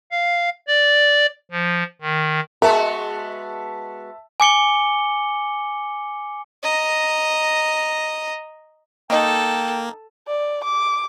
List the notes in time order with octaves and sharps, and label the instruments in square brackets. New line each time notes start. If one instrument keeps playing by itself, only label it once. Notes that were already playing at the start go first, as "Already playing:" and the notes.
[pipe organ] F5
D5
F3
D#3
[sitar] G#3 B3 F#4 [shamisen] A#4 [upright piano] E5 A5
[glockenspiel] G#5 D6 C#7 G7
[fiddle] D#5 A#5
[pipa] D#3 D#4 [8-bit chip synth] A#3 [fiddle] A4 [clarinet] G5
[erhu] D5
D6